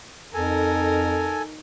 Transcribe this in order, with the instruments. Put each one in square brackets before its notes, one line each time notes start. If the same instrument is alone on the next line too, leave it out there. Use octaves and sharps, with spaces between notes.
[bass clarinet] F2 [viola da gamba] D#4 A#4 [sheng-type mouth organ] A4 G#5